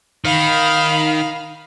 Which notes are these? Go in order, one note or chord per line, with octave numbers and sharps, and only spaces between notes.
D#3 F5 B5